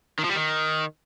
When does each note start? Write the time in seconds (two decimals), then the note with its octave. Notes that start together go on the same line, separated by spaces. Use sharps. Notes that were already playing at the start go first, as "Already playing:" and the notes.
0.19 D#3
0.24 F3
0.29 G3
0.35 D#3